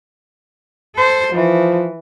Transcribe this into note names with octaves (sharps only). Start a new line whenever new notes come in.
A4 C5
E3 F3